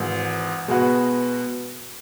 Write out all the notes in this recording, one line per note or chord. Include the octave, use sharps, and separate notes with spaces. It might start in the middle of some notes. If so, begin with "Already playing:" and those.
Already playing: G#1 G#2 E3
B2 G#3 B3 F#4 B4